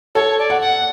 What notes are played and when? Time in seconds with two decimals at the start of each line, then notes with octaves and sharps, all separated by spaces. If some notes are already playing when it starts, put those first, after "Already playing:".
0.15 A4 C#5
0.39 D5
0.50 F#5
0.61 F#5